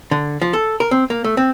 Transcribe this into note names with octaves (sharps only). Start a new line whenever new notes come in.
D3
F3
A4
A#4
C4
A#3
A3
C4